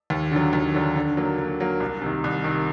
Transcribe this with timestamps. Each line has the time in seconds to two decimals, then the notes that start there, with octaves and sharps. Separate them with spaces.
0.10 D#2
0.32 D3 F#3
0.53 D#2
0.74 D3 F#3
0.96 D3
1.17 F#3 A#3
1.38 D3
1.60 F#3 A#3
1.80 C2
2.02 C3 D#3
2.24 C2
2.44 C3 D#3